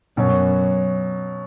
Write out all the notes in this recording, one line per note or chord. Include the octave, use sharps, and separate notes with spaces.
F#2 B2 F#3 C#4